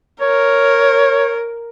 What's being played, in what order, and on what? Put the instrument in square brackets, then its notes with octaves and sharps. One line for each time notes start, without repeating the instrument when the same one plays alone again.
[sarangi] A#4 [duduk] C#5